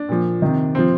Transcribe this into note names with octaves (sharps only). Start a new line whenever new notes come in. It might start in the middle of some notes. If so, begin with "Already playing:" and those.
Already playing: D4
A#2 F3
C3 D#3
C3 F3 C4